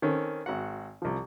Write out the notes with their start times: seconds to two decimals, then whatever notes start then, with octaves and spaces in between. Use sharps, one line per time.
0.02 D#3 C4 C#4 A4
0.46 G#1 F#4 F#5
1.02 C2 F3